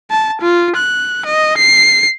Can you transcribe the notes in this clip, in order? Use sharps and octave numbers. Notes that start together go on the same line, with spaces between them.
A5
F4
F#6
D#5
C7